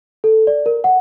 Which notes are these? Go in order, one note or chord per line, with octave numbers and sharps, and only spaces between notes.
A4
D5
A#4
F#5